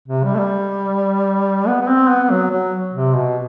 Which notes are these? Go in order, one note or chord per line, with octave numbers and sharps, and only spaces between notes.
C3
G3
A3
G3
B3
B3
C4
B3
F#3
F#3
C3
B2